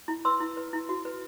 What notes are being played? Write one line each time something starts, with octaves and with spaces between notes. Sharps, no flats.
E4
B4 C6 E6
E4
B4
E4
F#4
B4